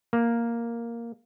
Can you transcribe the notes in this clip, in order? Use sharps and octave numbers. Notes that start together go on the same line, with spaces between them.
A#3